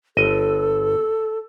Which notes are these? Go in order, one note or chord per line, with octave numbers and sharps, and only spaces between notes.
G1 A4 D#5